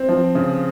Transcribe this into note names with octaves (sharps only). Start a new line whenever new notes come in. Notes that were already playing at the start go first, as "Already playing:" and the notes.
Already playing: C4
F3
C#3